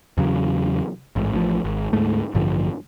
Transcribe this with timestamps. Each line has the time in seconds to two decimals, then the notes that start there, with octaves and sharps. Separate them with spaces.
0.18 E2 C#3 F#3
1.16 A1 G#2
1.32 A1 A2 D3 F3
1.64 G#1
1.93 D2 G#2 G#3 A3
2.35 A1 G2 D3 F3